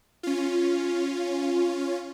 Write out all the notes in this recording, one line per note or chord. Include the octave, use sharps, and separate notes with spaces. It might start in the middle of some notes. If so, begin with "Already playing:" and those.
C#4 F4